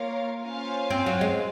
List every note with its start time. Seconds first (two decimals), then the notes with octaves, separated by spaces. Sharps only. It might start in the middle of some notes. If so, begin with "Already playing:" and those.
Already playing: A#3 F4 A#4 C#5 F5
0.45 C#4 F4 C5 F5 G#5
0.90 C4
1.06 F#3
1.21 G#3